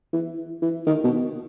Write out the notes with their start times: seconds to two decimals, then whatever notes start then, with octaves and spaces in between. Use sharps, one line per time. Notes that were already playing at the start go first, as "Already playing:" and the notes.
0.13 E3
0.62 E3
0.87 D#3
1.04 B2